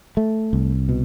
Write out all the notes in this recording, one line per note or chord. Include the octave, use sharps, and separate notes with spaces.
A3
C2
B2